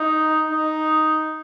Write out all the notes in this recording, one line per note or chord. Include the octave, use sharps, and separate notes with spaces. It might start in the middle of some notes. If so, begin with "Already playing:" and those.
Already playing: D#4
D#4